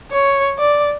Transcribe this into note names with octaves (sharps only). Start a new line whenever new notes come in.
C#5
D5